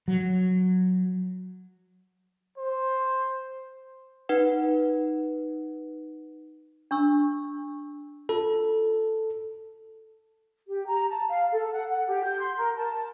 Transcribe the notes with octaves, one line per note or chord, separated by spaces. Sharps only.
F#3
C5
D#4 B4 F#5
D4 C#6 E6
F4 A4
G4
A#5
A5
F5
A4
F#5
F#5
G4
G6
C6
A#4
A5